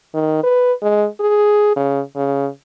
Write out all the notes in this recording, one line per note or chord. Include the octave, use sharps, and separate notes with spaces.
D#3
B4
G#3
G#4
C#3
C#3